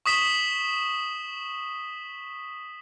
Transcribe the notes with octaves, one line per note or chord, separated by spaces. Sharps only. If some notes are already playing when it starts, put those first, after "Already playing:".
C#6 D#6 B6 E7 G7